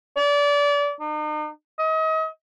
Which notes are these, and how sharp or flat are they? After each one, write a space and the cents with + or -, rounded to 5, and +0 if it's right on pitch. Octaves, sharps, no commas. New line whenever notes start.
D5 -30
D#4 -40
D#5 +35